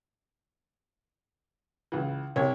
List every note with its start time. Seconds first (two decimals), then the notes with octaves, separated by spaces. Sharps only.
1.92 C#2 E3
2.36 C2 C#5